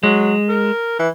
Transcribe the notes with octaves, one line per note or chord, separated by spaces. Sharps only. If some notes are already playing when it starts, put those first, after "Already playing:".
F#3 G#3
A#4
E3